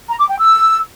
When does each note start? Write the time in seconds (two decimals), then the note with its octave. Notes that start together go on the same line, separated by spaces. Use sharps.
0.09 A#5
0.19 D6
0.29 G5
0.39 E6